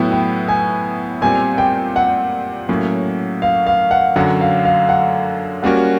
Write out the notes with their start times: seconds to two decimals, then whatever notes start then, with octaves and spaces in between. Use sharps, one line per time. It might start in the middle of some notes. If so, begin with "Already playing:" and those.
Already playing: A2 F#3 B3 E4 G5
0.11 G5
0.48 G#5
1.22 A#2 G3 C4 G#5
1.58 G5
1.96 F#5
2.69 A2 F#3 A#3 C#4
3.42 F5
3.67 F5
3.91 F#5
4.16 F#2 D3 F#3 F#5
4.41 F5
4.65 F5
4.89 F#5
5.63 G3 A#3 C#4 F#4 A#4 F#5